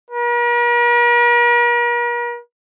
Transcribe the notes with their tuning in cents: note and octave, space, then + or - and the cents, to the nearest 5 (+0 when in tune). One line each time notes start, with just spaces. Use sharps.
A#4 +45